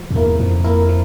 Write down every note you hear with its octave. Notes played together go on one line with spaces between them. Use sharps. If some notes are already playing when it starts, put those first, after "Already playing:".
Already playing: F3
F2
E2 A#3 E4 A#4
F2 F3
A#3 E4 A#4
F3